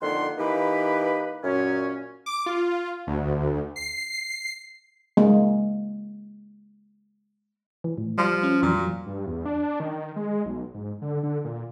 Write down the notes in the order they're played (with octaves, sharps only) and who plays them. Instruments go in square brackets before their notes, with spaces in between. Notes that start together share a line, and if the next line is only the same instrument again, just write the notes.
[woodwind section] F2 D3 D#3 A#3 F#5 C6
E3 A#3 D#4 G4 B4
F#2 A#2 C#4
[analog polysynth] D6
F4
D2
C7
[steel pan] G#3 A#3
[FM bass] E3
A2
[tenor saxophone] F3 [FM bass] G3
[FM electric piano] C#4 F4
[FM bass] F2 [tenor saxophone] A#2 [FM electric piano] E3 F#3
[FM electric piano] F#3
[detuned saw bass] G2
E2
D4
D#3
G#3
B1
G#2
D3
D3
A#2